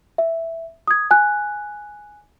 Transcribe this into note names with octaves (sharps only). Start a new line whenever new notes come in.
E5
D#6 G#6
G#5 F#6